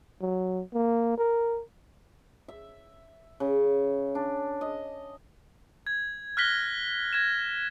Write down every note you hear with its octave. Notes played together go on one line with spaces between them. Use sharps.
F#3
A#3
A#4
E5
C#3
D4
D#5
G#6
F6 F#6 A#6 B6 G7
G#6 A#6 E7